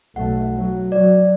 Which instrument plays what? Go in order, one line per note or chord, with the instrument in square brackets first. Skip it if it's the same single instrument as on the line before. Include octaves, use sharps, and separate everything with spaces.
[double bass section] B1 A3 [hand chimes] F#5
[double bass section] F#3
[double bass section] F#3 [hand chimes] D5